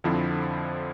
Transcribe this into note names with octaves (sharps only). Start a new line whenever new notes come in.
F2 D3 F3 C4 E4